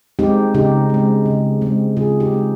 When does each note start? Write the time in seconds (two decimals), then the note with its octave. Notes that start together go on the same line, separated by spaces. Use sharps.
0.19 G#3 C4 D#4 G4
0.54 C#3 D#4 G4
0.90 G#3 C4
1.26 C#3
1.61 G#3 C4
1.96 C#3 F4 G#4
2.20 D#4 G4
2.32 G#3 C4